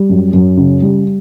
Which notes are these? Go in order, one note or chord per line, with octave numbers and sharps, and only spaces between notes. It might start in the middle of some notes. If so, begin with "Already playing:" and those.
Already playing: G3
F#2
F#2
C#3
G3